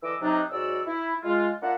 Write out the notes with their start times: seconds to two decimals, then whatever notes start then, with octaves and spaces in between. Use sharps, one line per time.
0.02 D3 E3 D#5 D6 E6
0.20 C3 F#3 D4 D#4
0.50 G#2 F#3 F#4 D5 E6
0.86 E4
1.24 G#3 F4
1.62 A#3 D4 F4 E5 F#5